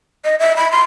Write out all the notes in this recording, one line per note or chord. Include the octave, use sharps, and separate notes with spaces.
D#5
E5
B5
C6